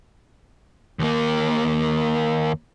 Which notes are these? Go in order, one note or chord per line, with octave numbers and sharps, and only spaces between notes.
D#2 A#3